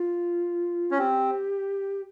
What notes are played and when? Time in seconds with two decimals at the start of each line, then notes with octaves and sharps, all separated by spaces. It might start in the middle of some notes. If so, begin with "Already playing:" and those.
Already playing: F4
0.91 C#4
0.98 C4 G4